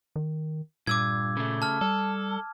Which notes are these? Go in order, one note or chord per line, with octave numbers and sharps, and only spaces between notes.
D#3
G2 A#2 D6 E6 G#6
C#3 A3
A5 F6
G3 A4